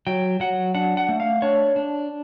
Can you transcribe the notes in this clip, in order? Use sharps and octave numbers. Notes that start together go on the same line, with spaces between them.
F#3 G5
F#3 F#5
D4 F#5
F#5
A3
F5
D4 C#5
D4